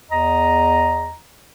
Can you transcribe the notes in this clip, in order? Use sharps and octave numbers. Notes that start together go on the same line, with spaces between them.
E2 D#5 A#5